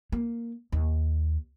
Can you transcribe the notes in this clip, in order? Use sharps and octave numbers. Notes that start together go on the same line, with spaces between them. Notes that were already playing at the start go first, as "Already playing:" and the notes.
A#3
D#2